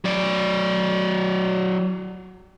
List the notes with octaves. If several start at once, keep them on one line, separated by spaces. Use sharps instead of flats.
F#3 D5